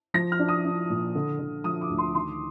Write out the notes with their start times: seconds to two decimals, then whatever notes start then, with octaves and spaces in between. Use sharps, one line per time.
0.14 F3 A#6
0.32 F6
0.39 D4
0.48 D#6
0.65 D4
0.90 A#2
1.15 D3
1.39 D3
1.64 F3 D#6
1.81 D6
1.90 D2
1.98 C6
2.15 D#3 C6